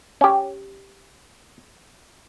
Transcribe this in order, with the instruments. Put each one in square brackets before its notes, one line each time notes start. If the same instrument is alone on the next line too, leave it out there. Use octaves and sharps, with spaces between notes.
[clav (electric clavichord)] C#4 G4